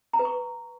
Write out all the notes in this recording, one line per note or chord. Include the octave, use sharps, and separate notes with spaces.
A#5
B4
C#6